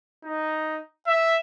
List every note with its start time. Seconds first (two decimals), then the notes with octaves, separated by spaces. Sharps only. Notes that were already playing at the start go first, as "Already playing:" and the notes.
0.24 D#4
1.08 E5